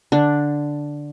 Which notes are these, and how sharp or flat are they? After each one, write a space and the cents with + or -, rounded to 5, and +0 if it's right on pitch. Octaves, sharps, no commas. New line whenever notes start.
D3 +0 D4 +0